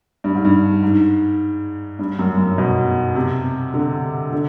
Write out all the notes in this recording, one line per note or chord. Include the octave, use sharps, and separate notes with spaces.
G2
G#2
G2
G#2
G2
F#2
F#2
B2
C3
D3
D3